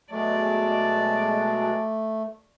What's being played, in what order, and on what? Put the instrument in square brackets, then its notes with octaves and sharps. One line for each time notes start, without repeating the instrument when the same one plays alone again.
[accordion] B2 F#3 G#3 [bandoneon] A3 [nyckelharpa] D5 [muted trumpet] A5